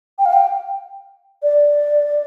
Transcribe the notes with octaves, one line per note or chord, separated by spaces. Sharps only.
G5
F5
G5
D5